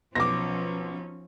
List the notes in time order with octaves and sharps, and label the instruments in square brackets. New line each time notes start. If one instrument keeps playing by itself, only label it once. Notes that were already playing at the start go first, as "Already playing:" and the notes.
[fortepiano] B1 [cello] F3 C#4 [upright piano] D6 A#6